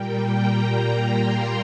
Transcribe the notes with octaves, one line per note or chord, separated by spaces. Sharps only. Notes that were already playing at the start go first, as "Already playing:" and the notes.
Already playing: A#2 G3 A#3 G5
A#5
C6